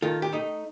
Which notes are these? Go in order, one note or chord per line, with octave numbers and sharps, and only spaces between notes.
D#3 F4 A4
G4
A3 D#4